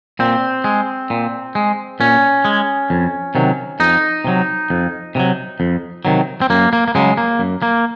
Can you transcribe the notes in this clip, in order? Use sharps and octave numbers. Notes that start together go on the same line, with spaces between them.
A#2 C4
G#3
A#2
G#3
A#2 C#4
G#3
F2
C3 D#3 F#3
F2 D#4
C3 D#3 F#3
F2
C3 D#3 F#3
F2
C3 D#3 F#3
C4
F#2 A#3
A#3
A#3
C#3 F#3 G#3
A#3
F#2
A#3